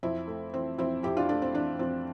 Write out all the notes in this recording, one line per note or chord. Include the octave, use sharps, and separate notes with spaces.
F2 C4 E4
A3
E3 C4
F2 C4 E4
F2 E4 G4
D4 F4
A3 D4
C4
E3 D4
F2 C4